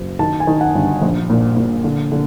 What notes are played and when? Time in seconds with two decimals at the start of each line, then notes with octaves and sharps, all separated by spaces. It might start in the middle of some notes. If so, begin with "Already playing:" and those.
Already playing: F#1
0.19 D#3 A5
0.40 G#5
0.47 D#3
0.61 F#5
0.75 G1
1.01 A#1
1.30 A#2
1.57 A#2
1.84 D3
2.12 D3